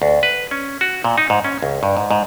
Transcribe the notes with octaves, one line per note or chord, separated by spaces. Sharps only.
D2
B4
C#4
F#4
A#2
D#4
G#2
C#4
C#2
G2
G#2
G#2